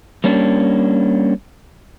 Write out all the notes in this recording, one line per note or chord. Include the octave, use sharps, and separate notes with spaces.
G3 A#3 C#4 D4